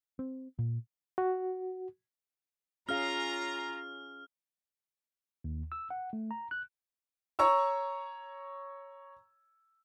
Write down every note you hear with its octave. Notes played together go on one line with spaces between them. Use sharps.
C4
A#2
F#4
C#4 F4 G#4 F5 A#5 F6
D#2
E6
F#5
A3
A#5
F#6
C#5 A#5 C#6 E6